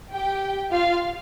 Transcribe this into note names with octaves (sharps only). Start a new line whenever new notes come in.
G4 G5
F4 F5